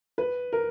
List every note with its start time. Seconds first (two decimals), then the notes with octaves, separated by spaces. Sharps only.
0.18 B4
0.53 A#4